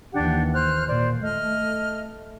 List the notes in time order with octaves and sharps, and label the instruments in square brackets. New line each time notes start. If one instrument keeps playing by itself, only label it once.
[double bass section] D#2 E3 [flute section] D4 G4 F#5
[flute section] C5 F6 F#6
[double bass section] A#2 [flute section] C5 D5
[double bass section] A3 [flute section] D#5 F6